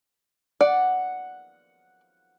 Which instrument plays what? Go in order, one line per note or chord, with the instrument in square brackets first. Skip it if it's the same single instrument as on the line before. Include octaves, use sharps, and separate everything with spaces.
[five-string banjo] D5 [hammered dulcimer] F#5